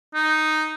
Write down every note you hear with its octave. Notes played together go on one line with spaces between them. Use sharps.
D#4